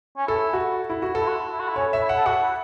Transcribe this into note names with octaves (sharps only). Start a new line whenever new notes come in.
C#4
E4 A4
F#4
E4
F#4
A4
E4
F#4
E4
F#4
E4
C#4 C#5
E5
E4
F#5
A4
F#4 F#5
E4